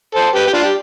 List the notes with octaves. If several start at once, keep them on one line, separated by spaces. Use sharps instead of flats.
A4 C5
G4 B4
G4
D4 F4
G4